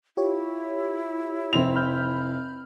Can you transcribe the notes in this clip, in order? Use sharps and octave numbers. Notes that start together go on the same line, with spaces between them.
E4 F4 G4 C#5
F1 C4 F7
B5 F6 G6